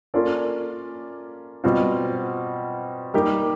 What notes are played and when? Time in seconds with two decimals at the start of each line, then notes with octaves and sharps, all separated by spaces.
0.14 A#3 C#4 F4 A4 D5
1.64 B2 G3 C4 F4
3.14 G3 A#3 D#4 G4